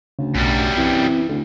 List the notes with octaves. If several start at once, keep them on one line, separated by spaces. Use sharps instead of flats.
D2 C#3
B1 F#2 G3
E3 C4
D2 D3